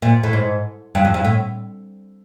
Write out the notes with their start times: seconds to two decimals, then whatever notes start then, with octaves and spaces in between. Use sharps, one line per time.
0.02 A#2
0.23 A2
0.33 G#2
0.95 G2
1.05 F2
1.14 G2
1.25 A2